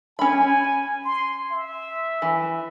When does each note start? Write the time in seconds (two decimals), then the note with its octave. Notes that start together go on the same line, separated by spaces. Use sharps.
0.19 C#4 G#5 B5
1.04 C6
1.52 E5
2.22 E3